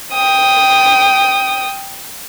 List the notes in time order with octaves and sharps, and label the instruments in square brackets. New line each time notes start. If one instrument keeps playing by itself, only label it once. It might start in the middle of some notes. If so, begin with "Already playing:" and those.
[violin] G5 D#6